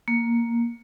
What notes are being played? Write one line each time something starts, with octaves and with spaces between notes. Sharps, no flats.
A#3